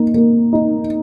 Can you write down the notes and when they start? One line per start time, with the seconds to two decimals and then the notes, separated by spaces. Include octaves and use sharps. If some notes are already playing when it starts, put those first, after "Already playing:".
Already playing: A#3 D#4
0.14 A#3
0.53 D#4